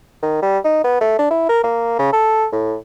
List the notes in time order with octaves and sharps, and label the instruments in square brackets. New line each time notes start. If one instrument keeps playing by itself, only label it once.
[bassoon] D#3
G3
D#4
B3
A3
D4
E4
A#4
A#3
C#3
A4
A2